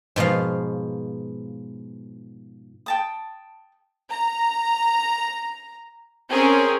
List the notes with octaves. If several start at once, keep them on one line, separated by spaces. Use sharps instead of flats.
G#2 B2 F3 F5
G5 A5 D#6
A#5
C4 C#4 G#4 A#4 C#5